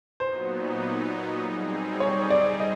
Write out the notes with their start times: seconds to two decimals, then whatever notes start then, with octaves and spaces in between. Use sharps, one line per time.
0.20 A#2 F#3 B3 D#4 C5
1.40 G3 C4 D#4 G#4
2.00 C#5
2.30 D5
2.60 D#5